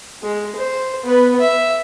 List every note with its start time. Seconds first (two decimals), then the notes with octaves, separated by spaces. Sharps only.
0.22 G#3
0.56 C5
1.04 B3 B4
1.41 E5